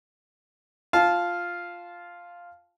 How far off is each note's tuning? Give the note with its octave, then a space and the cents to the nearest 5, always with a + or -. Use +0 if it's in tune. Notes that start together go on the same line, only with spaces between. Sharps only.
F4 +0 F5 +0 A5 -15